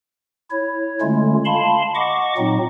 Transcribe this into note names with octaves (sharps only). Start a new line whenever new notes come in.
E4 C#5
D3 G#3 A3 C#4 F4
F5 A5 B5 C6
D#5 F#5 C#6 D6
A#2 F#3 C4 D#4